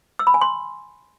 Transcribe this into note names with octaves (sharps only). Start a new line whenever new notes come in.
E6
B5
G#5
C6